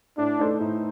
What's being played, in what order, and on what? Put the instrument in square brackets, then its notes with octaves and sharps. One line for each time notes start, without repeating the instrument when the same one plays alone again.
[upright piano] A2 [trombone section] D4
[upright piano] A3 D#4 A4 C5
[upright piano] A2 [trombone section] D#4